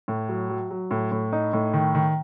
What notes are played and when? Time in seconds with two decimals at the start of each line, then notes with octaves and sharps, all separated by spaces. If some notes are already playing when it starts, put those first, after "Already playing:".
0.08 A2
0.29 F#3
0.50 F#3
0.71 F#3
0.91 A2
1.12 A2
1.32 D#4
1.53 A2
1.74 D#3
1.95 D#3